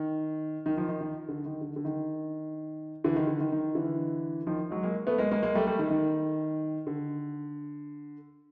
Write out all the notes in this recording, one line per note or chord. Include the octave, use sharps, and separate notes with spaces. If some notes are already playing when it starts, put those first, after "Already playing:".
Already playing: D#3
D#3
D#3 F3
D#3
D#3
D3
D#3
D3
D3
D#3
D3 E3
D#3
D3
D#3
D#3
D3 E3
D#3 F3
F#3 G#3
G#3 A#3
A3 B3
G#3 A#3
G#3 A#3
G#3 A#3
G3 A3
G3 A3
D#3
D#3
D3